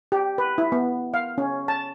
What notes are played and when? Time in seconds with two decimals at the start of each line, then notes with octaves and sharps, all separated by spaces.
0.12 G4
0.38 B4
0.58 E4
0.72 B3
1.14 F5
1.38 C#4
1.68 A5